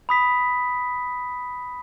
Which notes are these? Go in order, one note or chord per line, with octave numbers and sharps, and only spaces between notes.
B5 D#6 B6